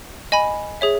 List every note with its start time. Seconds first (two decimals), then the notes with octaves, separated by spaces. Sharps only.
0.32 D#5 G#5 B5
0.81 G#4 C#5 E5